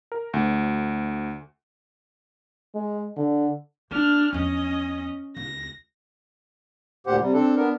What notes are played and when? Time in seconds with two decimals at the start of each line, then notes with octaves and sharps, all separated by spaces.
0.12 A#4
0.34 D2
2.75 G#3
3.16 D3
3.91 A#3 D4 F6
4.33 E2 F3 C#4 D#5
5.37 C#2 A#6
7.07 D2 A#2 G4 C5 F#5
7.21 C3 G3
7.33 C4 D4 A4
7.57 B3 D4 A#4